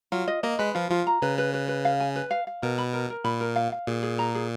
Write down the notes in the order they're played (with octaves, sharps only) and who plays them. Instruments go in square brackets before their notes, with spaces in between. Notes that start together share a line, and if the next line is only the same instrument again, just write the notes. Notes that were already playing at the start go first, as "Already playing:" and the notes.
[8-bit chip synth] F#3 [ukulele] F4
[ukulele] D#5
[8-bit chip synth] A#3 [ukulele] D#5
[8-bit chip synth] G#3 [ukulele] B4
[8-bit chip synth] F3 [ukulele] F4
[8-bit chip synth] F3 [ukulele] F4
[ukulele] A#5
[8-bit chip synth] C#3 [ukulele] B4
[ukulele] B4
B4
B4
F5
G#5
B4
F5
F5
[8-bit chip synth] B2 [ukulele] A#4
[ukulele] B5
A#4
A#4
[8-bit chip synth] A#2 [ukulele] B5
[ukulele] A#4
F5
F5
[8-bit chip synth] A#2 [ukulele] G#4
[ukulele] G#4
A#5
G#4